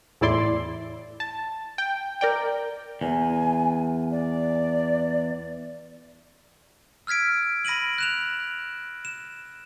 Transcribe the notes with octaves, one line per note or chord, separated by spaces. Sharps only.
E2 A2 E4 D5 C6
A5
G5
A#4 D5 G5
E2 G#5
D5
E6 F6 G#6 B6 D7
B5 A#6 D7 D#7 F#7
F#6 E7 F7
E7